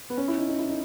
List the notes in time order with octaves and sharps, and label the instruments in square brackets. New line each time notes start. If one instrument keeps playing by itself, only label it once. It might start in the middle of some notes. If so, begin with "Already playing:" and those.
[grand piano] B3
C#4
E4
D#4
D#4
E4
D#4